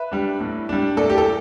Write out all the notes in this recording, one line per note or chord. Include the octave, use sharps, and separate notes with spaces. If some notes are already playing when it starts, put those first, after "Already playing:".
Already playing: B4 E5
G3 D4
A2
G3 D4
A2 A4 D5
G4
A4